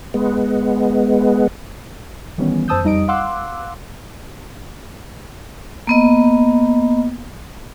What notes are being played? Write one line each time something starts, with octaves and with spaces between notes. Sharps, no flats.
G#3 B3
D#3 E3 G3 B3 C#4
F#2 C5 A5 D#6 E6 G6
F2 G3 D#4 D#5 D#6 D7
F5 F#5 C6 D6 E6 F#6
A#3 B3 D#5